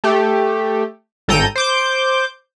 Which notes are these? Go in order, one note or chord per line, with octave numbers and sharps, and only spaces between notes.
A3 G4
G#1 A4 G5 A#5 G6 D#7
C5 D6 G6